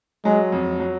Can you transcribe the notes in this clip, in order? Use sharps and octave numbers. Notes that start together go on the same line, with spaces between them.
F#3 G#3
F2
F#3